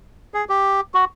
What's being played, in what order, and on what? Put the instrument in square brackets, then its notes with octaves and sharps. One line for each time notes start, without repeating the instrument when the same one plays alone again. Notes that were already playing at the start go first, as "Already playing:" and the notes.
[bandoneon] G#4
G4
F#4